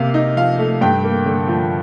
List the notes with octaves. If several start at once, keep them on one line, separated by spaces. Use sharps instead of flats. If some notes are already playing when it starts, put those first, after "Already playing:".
Already playing: C3 A#3 F5
D#4
F3 F5
A3
G2 G5
A#3
D3
F3